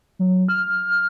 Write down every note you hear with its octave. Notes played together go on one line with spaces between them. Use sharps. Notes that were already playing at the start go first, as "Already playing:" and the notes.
F#3
F6